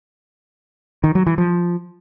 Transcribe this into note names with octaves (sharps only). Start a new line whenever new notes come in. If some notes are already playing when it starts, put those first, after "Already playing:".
D#3
F#3
E3
F3